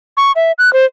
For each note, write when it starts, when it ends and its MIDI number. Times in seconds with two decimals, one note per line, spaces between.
0.17 0.32 85
0.36 0.52 76
0.59 0.72 90
0.73 0.85 72